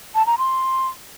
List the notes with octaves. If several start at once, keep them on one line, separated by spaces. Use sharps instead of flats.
A5
A#5
C6